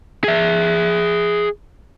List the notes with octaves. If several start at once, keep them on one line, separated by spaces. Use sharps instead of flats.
G#4 E5